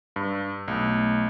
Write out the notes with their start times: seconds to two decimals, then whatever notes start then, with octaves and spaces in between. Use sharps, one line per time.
0.16 G2
0.68 B1 A3